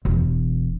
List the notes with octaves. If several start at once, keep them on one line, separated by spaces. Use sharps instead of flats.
E1